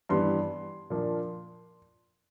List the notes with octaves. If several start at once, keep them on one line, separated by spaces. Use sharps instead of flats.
G2 E3 G3 B3 C6
A#2 F3 A#3 D4